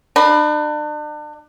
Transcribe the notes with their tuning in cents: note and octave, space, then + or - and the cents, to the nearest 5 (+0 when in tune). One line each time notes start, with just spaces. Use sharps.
D4 +40 B5 +0